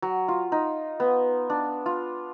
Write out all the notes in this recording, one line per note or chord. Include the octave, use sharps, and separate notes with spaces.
F#3
F4
D#4
B3
D4
F4